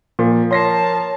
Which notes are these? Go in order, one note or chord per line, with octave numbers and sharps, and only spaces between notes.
A#2 F3
A#4 C#5 A5 C6 A#6 C7